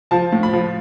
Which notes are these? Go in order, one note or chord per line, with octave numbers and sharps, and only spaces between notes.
F3 A5
A2
B5
F3